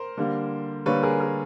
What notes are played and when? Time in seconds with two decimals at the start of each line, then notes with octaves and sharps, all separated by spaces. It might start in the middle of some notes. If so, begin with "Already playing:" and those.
Already playing: A#4 C5
0.17 D3 G3 A#3
0.86 D3 G3 A#3 B4 C#5
1.03 G#4 A#4
1.20 G#4 A#4